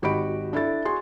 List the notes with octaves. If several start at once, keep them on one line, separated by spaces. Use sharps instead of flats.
G#1 F#4 G4 D#5 B5 D7
D4 E4 A4 A6
F#4 G#4 C6